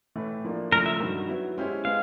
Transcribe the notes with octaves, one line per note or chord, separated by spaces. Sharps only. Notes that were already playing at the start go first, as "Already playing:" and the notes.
A2 E3 A3
F3 A#3 D4
C#3 F3 A3 A#4
E5
G2 D#3 F#3
F#3 B3 E4
G#3 C#4 E4 G4 C5
G#3 B3 F5